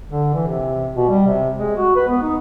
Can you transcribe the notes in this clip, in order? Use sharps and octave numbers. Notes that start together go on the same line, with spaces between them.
D3
E3
C3
B2
G3
C3
G#3
F#4
B4
B3
D#4